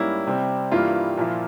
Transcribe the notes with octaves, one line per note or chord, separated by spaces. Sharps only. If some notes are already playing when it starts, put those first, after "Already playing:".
Already playing: G#2 G3 A#3 C#4 E4
C3 G3 C4 G4
G2 E3 G3 A#3 E4 F4
A#2 F3 A#3 E4